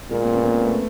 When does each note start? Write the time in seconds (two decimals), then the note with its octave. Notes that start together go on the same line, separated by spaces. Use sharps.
0.11 A#2 G#3 A#3
0.21 A#3 C4
0.32 B3 C#4
0.43 A#3 C4
0.65 A3 B3